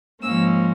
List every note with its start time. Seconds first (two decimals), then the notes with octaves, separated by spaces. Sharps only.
0.21 G#2 F3 A#3 C#4 E6